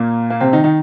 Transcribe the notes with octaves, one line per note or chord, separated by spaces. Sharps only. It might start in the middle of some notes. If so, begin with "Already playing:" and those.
Already playing: A#2 A#3
A#3
C3 C4
D#3 D#4
D#3 D#4